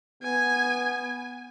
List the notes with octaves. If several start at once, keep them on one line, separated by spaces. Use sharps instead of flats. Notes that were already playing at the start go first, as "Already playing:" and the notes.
B3 G#5